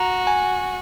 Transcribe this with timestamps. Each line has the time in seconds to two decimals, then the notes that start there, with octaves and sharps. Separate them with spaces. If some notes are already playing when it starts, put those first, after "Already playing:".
Already playing: F#4 A#5
0.27 G#5